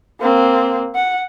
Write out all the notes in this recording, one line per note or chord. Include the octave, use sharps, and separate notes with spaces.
A#3 C4
F#5